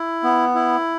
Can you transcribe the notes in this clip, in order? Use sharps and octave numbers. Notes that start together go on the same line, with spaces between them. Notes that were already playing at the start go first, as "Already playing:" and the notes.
Already playing: E4
B3
E4